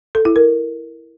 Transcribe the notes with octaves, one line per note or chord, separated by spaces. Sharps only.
A4
E4
A#4